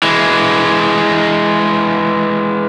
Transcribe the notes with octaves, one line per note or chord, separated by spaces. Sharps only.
E3 G#3